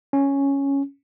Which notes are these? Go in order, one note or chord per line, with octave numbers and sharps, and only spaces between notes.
C#4